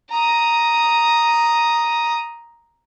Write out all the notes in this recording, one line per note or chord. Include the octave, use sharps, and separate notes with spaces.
A#5 D#6